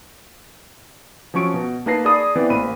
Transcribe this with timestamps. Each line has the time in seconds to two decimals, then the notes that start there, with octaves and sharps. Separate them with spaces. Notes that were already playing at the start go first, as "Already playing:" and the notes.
1.34 F3 F#3 C#4 C#6 D7
1.54 B2
1.86 A#3 D#4 B4 A5 A#6 C7
2.05 G#4 D5 A5 B5 D#6
2.36 E3 B3 C4 D5
2.50 A1 A#3 C5 B5 D#7